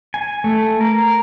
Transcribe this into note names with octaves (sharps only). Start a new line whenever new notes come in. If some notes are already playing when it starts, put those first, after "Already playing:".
G#5
A3
A#4